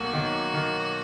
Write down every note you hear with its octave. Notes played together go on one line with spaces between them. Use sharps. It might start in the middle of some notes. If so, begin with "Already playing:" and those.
Already playing: B1 A#3 F#4
D#3
D#3